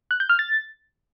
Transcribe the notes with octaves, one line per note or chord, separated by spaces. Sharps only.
F#6
G6
F6
A6